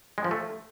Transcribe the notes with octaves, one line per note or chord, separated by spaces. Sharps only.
G#3
F3
A3